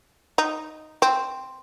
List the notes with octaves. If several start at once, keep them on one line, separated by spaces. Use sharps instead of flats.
D#4
C4